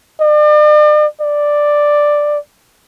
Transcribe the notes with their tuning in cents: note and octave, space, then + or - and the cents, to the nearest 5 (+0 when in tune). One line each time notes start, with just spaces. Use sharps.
D5 +40
D5 +5